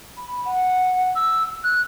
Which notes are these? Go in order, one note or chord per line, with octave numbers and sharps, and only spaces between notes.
B5
F#5
E6
F#6